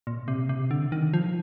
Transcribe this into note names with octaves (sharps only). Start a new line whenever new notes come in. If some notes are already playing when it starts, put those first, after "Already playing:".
A#2
C3
C3
D3
D#3
F3